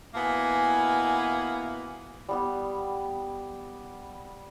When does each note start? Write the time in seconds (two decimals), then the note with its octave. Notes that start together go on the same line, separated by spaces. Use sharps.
0.15 B2 A#3 B3 E4 G#5
2.29 G3 B3 G4